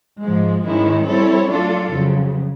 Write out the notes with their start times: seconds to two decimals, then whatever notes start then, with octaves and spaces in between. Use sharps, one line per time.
0.22 G#2 F3 G#3
0.65 G#2 D#3 G#3 C#4 E4
1.07 G3 C4 E4 A4 C#5
1.49 F#3 A3 D4 F4 A4
1.92 F2 C#3 F#3